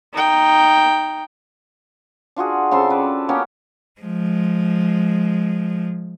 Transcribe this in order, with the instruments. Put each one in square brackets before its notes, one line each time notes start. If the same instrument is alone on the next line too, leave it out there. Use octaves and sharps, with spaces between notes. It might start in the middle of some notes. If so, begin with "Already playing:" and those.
[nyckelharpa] D#4 G5
[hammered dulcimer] D4 F4 F#4 G#4
C#3 C4 A4 C6
B4 D5
A#3 B3 C#4 G4
[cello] F3 G#3